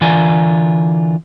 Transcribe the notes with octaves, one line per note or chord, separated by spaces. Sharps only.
D3 E3 F4 A#4 D5 G#5